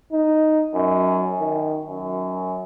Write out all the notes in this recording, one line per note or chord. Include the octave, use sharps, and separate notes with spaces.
D#4
F#2
D#3
F#2